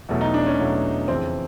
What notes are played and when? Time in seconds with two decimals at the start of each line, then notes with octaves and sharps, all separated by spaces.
0.09 E2 B2 F#3 A3
0.21 D#4
0.34 D4
0.46 C#4
0.59 E2 B2 F#3 A3
1.08 F2 C#3 E3 C4